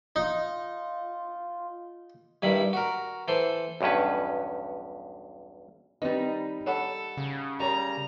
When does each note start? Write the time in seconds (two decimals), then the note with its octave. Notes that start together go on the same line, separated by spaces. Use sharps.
0.16 D#4 F4
2.42 G2 D#3 G3 E4 B5
2.73 F#4 A#4
3.28 E3 A4 C5 C6
3.81 B1 E2 G2 C#4 B4
6.02 D#3 G3 C4 D#4 B4
6.66 A4 C#5 F#5 B5
7.17 C#3
7.60 G3 A#4 C#5 A#5